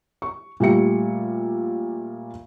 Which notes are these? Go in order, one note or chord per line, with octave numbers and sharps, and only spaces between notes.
C#6
A#2 G3 A3 C#7